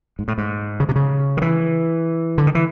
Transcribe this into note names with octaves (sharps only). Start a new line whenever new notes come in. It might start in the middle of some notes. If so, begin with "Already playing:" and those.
G#2
A2
G#2
C#3
C3
C#3
D#3
E3
D3
D#3
E3